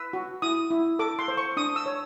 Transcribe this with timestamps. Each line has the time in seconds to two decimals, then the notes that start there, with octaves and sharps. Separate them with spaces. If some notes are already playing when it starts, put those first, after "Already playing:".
Already playing: B4 E6
0.13 F#4
0.42 E4 D#6
0.70 E4
0.99 A4 D6
1.19 C6
1.28 C5
1.37 C#6
1.57 D4 D#6
1.76 E6
1.86 C#5